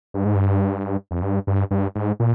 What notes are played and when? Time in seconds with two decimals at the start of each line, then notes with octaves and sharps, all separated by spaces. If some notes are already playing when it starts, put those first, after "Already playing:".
0.14 G2
0.25 G#2
0.35 G2
1.11 F2
1.22 G2
1.47 G2
1.71 G2
1.95 G#2
2.20 A#2